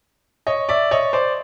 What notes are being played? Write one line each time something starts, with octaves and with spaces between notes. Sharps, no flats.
C#5 D#5
D5 E5
C#5 D#5
C5 D5